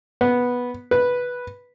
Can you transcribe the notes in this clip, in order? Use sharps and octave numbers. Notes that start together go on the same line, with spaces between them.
B3
B4